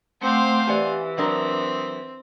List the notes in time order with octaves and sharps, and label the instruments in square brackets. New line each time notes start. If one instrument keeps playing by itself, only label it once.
[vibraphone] A3 F#5 D6 [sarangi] C4 [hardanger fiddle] C5 F5
[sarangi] E3 [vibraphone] G4 [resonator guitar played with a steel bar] D5 F#5 G#5
[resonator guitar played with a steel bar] F#3 D4 A#4 [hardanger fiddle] C4 [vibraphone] D#6